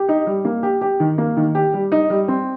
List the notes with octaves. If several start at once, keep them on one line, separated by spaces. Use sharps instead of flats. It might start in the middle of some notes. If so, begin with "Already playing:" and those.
Already playing: G4
D#4
G3
A#3
G4
G4
D#3
A#3
D#3
G4
G3
D#4
G3
C4